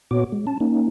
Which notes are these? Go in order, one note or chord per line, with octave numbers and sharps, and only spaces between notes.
A#2 B3 F#4 C#5 D6
G#3
C#4 A5
A#3 C#4 D#4